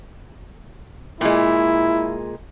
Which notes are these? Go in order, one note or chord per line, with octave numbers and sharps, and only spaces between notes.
A#2 G#3 E4